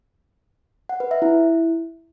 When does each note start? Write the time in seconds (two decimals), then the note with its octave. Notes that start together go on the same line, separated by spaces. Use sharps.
0.89 F#5
1.00 B4
1.11 E5
1.22 E4